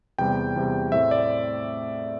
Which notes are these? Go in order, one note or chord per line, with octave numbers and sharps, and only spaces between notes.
E2 C3 G3 G5
E2 C3 G3
A2 A3 C4 E5
D5